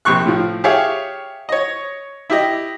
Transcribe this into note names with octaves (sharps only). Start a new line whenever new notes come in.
A#1 C3 C#6 F#6
A2 F3
G4 G#4 C#5 E5 F5
C#5 D#5
E4 G4 D#5